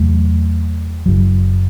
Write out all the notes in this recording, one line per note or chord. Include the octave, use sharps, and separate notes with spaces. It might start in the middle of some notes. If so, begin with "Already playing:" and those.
Already playing: E2 C3 F#3 A3
F#1 F#2 F#3